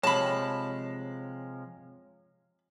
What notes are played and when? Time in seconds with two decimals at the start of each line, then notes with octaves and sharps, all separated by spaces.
0.03 C3 F3 G#3 C#5 A5 B5